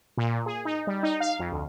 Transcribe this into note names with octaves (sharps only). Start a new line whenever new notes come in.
A#2
G#4
D#4
G3
D#4
F5
F2
D2